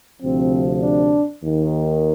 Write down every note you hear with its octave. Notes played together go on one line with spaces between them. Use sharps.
D2 C3 F3 C4
D4
D#2 D#3